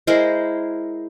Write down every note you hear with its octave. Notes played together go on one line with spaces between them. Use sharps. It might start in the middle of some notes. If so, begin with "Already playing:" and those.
G#3 E4 A#4 C5